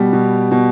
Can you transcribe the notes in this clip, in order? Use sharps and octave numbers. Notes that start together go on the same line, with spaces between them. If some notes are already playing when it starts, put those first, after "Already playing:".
Already playing: B2 G3 G4
B2
B2